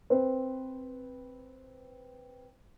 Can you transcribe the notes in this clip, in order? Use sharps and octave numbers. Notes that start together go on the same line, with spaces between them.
C4 B4 C5